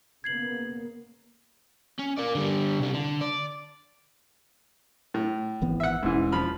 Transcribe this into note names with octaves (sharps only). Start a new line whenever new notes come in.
C#3 A#3 B3 G#6 C7 F#7
C#4
A#4 D5
D3 G3
C3 G3
D3
D5
A2
G#1 E3 B3
E5 F#5
E1 G#2 E3 C#4
F3 B5 F6